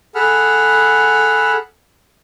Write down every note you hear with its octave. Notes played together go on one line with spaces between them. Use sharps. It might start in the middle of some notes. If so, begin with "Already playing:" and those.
G#4 A4 F#5 B5 F6